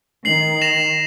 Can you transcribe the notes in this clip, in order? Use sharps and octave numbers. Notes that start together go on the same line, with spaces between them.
D#3 C7 F#7
A#6 E7 F7